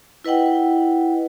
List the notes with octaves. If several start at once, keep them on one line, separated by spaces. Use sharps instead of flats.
E4 B4 D#5 F#5 G5